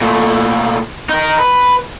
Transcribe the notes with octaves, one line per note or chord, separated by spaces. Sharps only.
A#2 A3
D#4 A#4
B4